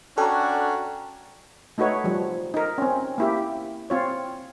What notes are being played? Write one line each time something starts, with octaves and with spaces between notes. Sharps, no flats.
C#4 D4 F#4 A4 G5 A#5
A3 D#4 F#4 B4 C#5
F3 G3
D#4 A#4
C4 C#4
A#3 E4 G4
C4 F4 C#5